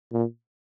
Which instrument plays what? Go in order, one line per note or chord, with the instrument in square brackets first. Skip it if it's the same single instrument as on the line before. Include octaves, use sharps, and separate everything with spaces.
[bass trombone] A#2